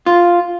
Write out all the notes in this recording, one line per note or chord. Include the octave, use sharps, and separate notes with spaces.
F4